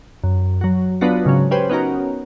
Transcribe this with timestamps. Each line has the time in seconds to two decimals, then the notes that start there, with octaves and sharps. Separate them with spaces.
0.24 F#2
0.61 F#3 F#4
1.01 F#3 B3 D4 F4 F#4
1.25 G#2 C#3 F#3 C#4
1.51 C#4 G4 B4 C5
1.70 B3 C#4 D#4 F#4 A#4